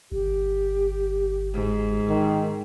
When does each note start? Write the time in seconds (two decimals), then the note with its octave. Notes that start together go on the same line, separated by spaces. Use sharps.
0.12 G1 G4
1.54 G#2
2.09 D#3